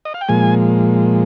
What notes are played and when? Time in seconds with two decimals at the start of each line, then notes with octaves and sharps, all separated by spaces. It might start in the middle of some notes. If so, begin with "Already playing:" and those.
0.05 D#5
0.14 F5
0.21 G5
0.29 A#2 F3 G#3 G#5